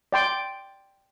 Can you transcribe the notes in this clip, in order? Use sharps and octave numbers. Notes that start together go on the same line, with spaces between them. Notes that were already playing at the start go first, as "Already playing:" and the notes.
D5 G5 C6